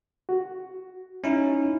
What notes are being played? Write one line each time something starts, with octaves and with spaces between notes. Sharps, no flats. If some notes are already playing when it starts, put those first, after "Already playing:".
F#4
C#4 D#4 E4